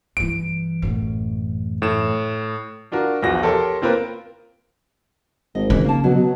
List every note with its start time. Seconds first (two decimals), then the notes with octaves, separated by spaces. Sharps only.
0.17 G2 E3 D7
0.82 A1 F#2
1.82 A2 E7
2.92 D4 F4 F#4 A#4
3.23 B1 E2 F3 F#4 A#6
3.42 G4 A4 A#4 C#5 C6
3.82 A#3 C4 F4 A#4 B4
5.55 G#1 D#5
5.70 C#3 E3
5.85 A#3 A5
6.04 B2 F#3 B4
6.15 B2